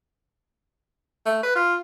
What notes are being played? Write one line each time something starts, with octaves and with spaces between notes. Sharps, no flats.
A3
B4
F4